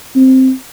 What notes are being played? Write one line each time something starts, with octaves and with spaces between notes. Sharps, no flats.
C4